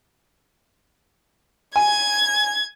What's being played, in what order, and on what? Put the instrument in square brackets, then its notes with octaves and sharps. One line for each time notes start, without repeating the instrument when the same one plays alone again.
[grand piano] G#5 [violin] G#6